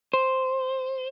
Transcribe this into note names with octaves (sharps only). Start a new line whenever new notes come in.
C5